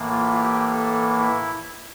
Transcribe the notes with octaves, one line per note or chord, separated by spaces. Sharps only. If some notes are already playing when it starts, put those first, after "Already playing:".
Already playing: A2 E3 A#3
F4
G4
A4
E4